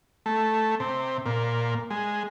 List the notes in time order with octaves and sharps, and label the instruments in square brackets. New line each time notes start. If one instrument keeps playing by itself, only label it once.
[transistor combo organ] A3
C3
A#2
G#3